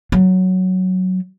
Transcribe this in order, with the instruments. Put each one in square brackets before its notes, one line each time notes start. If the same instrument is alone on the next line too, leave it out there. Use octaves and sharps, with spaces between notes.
[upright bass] F#3